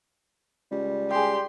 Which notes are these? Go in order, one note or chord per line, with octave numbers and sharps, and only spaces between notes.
C#2 G3
G4 G#4 G5 C6